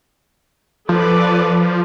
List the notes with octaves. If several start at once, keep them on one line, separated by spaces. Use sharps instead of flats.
F3 A4 B4 D5